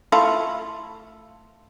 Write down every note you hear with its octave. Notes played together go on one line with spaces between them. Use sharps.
A3 E4 F4